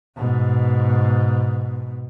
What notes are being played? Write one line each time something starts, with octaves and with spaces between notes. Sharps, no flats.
G#2 B2